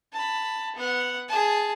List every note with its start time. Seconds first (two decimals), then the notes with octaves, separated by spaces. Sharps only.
0.13 A5 B5
0.75 B3 F#5
1.29 G#4 A5